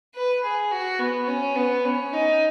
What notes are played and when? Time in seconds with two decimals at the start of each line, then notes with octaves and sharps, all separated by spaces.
0.15 B4
0.44 G#4
0.71 F#4
1.00 B3
1.27 C#4
1.56 B3
1.85 C#4
2.13 D#4